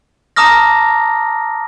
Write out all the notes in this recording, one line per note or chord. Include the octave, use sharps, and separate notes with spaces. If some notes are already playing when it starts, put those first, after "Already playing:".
A5 A#5 D6 D#6 F6 A#6